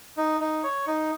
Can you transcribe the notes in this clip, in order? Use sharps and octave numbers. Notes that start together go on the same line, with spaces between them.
D#4
D#4
C#5
D#4